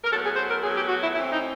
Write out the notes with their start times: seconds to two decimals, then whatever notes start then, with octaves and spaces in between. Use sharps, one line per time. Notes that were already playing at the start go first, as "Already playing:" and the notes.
0.04 A#4
0.11 A2 F#3 B3 A4
0.24 G#4
0.36 C5
0.49 A#4
0.63 A2 F#3 B3 G#4
0.75 G4
0.89 F#4
1.01 E4
1.14 E3 A3 C4 E4
1.31 D#4